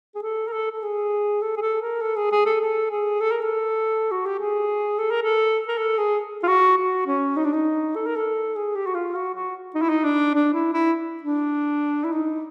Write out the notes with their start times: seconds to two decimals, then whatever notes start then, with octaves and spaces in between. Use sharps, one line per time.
0.15 G#4
0.23 A4
0.47 A#4
0.52 A4
0.71 A4
0.82 G#4
1.42 A4
1.57 G#4
1.61 A4
1.82 A#4
2.01 A4
2.16 G#4
2.31 G#4
2.46 A4
2.61 A4
2.90 G#4
3.20 A4
3.31 A#4
3.41 A4
4.11 F#4
4.26 G4
4.39 G#4
4.98 A4
5.10 A#4
5.22 A4
5.68 A#4
5.77 A4
5.98 G#4
6.43 F4
6.48 F#4
6.77 F#4
7.06 C#4
7.37 D#4
7.44 D4
7.53 D#4
7.95 A4
8.06 A#4
8.16 A4
8.55 G#4
8.75 G4
8.87 F#4
8.94 F4
9.15 F#4
9.34 F#4
9.75 D#4
9.82 E4
9.89 D#4
10.04 D4
10.34 D4
10.53 E4
10.73 E4
11.23 D4
12.04 E4
12.12 D#4